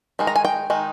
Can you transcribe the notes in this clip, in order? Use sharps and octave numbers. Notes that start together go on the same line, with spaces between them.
D#3 G#3 D#4
A#5
G#5
G5
D#3 G#3 D#4